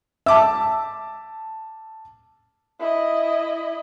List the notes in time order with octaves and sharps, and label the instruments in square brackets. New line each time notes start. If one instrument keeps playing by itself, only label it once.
[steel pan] E5 [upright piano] A5 D6 E6
[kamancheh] E4 D#5